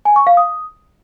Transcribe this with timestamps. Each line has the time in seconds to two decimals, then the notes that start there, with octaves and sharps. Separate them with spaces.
0.05 G#5
0.16 C#6
0.27 F5
0.37 D#6